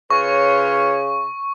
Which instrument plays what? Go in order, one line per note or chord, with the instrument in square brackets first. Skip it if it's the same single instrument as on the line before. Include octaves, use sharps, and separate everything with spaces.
[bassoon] C#3 [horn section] F4 B4 C#5 [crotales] C#6